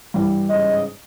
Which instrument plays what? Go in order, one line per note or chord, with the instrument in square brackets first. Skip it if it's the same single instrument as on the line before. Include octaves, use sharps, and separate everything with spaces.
[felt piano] G2 E3 G3
[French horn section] G#2 C#3 D#5